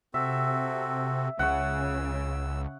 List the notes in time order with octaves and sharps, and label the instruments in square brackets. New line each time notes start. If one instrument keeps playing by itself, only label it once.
[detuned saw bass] C3 [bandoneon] C4 F#4 A4 [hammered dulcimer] E5
[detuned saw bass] C#2 [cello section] C#3 [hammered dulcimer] F#5 C#6 [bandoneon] E6